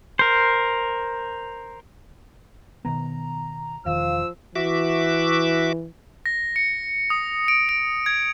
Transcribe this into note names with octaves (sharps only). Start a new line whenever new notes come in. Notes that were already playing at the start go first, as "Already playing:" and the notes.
A#4 C5
B2 D#3 B3 A#5
E1 D#3 F3 F5 E6
E3 F#4 E5 D6
A#6
C#7
D#6
D7
D7
G#6